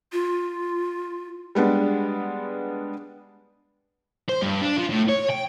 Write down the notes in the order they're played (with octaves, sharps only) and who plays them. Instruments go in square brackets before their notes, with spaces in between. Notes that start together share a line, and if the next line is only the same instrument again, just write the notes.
[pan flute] F4
[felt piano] G3 G#3 B3 D4
[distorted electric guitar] C5
G2
D4
F3
A2
C#5
G5